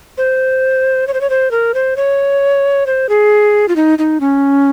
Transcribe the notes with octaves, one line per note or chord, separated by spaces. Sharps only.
C5
C#5
C5
C#5
C5
A#4
C5
C#5
C5
G#4
F4
D#4
D#4
C#4